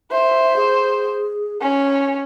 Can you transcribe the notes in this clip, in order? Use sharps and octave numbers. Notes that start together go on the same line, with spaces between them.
C5 E5
G#4
C#4 G#5